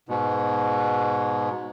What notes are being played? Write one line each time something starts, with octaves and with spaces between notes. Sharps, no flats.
G#2 B2